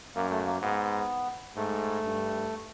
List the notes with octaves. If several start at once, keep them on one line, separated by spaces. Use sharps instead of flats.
F#2 A#3
A3
A#3
G#2 B3
G#2 A3
G2